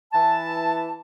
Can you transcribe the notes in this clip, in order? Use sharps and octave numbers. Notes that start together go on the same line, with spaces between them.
E3 A5